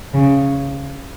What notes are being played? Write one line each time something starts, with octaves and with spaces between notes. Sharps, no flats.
C#3